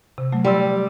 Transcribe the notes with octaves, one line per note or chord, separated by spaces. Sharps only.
C3
F#3 A3
G3 G5 C6 E6